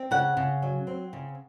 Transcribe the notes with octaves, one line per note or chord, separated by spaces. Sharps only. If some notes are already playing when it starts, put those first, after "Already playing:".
Already playing: C4
C#3 F#5
C#3
F#3
C4
C#3